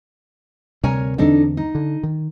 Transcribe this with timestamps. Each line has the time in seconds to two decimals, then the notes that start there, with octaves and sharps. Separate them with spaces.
0.83 D2 C3 G3 A#4 C#5 G#5
1.18 E2 D3 C4 D4 D#4 A4
1.57 D#4
1.75 D3
2.03 D#3